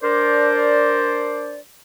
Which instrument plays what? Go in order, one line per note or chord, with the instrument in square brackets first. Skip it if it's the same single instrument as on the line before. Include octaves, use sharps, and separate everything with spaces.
[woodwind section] D4 A#4 C5 D5